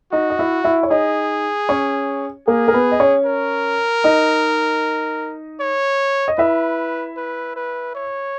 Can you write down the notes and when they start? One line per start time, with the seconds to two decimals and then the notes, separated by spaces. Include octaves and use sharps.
0.13 D#4 F#4 D#5
0.30 D#5
0.39 E4 E5
0.64 E4 E5
0.83 C#5
0.91 D#4 G#4 D#5
1.69 C#4 C#5
2.48 A#3 G#4 A#4
2.68 A#4
2.73 B3 B4
2.92 D#5
3.00 C#4 C#5
3.26 A#4
4.04 D#4 D#5
5.60 C#5
6.28 D#5
6.38 E4 B4 E5
7.17 B4
7.56 B4
7.95 C#5